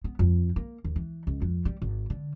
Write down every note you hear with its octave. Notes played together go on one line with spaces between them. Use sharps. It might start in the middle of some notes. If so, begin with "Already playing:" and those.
B3
F2
A#3
D#2
E3
C#2
F2
G3
G#1
D3